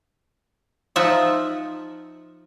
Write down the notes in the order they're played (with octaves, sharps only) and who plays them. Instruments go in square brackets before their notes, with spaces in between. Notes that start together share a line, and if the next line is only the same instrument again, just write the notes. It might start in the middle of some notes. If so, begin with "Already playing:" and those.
[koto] F3 D#4 F4 E5 F#5